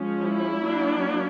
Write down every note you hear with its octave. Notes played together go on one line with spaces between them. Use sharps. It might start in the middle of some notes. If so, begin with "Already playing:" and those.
Already playing: F3 G#3 C#4
E4
F#3 A#3 D4